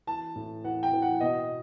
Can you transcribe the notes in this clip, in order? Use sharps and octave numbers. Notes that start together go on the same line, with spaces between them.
E3 A5
A2
E3 F#5
G5
E3
F#5
B2 D#5